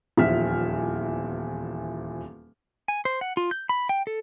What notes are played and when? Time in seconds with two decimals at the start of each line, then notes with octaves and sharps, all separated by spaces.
0.17 D#1 E2 F3 E5 F6 B6
2.88 G#5
3.05 C5
3.21 F#5
3.37 F4
3.51 G6
3.69 B5
3.89 G5
4.07 A4